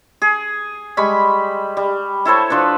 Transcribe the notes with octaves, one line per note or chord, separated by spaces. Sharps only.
G#4
G3 G#3 B5 C#6
G3
E4 A4 C5 C#5
F3 D4 B4